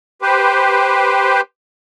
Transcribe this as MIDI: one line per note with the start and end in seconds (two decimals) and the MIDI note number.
0.22 1.41 67
0.22 1.41 71
0.22 1.41 72